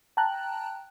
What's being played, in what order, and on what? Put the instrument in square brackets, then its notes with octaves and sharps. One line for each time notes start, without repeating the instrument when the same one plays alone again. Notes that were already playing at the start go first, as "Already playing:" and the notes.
[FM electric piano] G5 A5 A#5 F#6